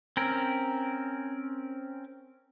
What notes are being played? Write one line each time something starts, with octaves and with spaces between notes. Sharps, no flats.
C4 C#4 A#4